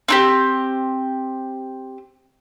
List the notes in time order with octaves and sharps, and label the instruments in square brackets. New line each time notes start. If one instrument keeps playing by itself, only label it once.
[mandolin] C4 D#4 G4